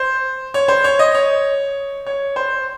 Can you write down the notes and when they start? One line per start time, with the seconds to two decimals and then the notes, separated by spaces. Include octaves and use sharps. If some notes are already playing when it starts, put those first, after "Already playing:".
Already playing: C5
0.54 C#5
0.68 C5
0.84 C#5
0.99 D#5
1.15 C#5
2.06 C#5
2.36 C5